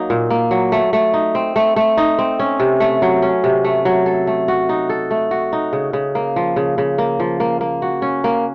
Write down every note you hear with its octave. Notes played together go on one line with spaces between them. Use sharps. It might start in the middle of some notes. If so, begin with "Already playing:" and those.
Already playing: F#3 A#3 D#4
A#2
A#3
F#3
A3
A3
D#4
C4
A3
A3
D#4
C4
C#4
C3
A3
F#3
C#4
C3
A3
F#3
A4
A3
F#4
D#4
A4
A3
F#4
D#4
C#3
C#3
A#3
F3
C#3
C#3
A#3
F3
A#3
A#3
F#4
C#4
A#3